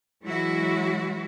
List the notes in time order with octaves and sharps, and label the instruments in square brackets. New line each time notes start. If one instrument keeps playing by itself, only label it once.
[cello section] E3 F#3 G#3 E4 F#4